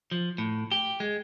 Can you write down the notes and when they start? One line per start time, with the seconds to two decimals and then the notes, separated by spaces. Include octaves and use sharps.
0.11 F3
0.38 A2
0.71 G4
1.00 G#3